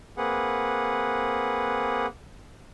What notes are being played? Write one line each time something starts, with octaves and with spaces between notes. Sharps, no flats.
A#3 C4 G#4 B4 F#5